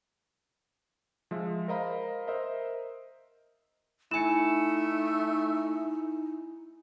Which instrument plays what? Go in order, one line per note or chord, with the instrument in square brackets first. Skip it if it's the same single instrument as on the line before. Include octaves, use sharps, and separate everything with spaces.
[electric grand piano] F3 G#3 E5
A#4 C5 D#5 F5 A#5 B5
A#4 C5 D#5 E5 A#5
[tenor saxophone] A3 [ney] D#4 [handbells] E4 G#5 [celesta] C#7 E7